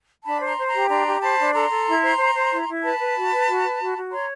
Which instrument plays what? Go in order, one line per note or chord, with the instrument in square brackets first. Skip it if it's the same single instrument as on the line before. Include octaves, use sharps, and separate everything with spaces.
[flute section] D4 A5 B5
C5 A#5 C6
C5
A#5 C6
G4
D4 A#5 C6
G4
C5 A5 B5
D4
A4 A#5 C6
A4
E4
C5
C5
C5
E4
E4
B4 A5 B5
B4
F#4
B4
F#4
B4
F#4
F#4
C#5 A#5 C6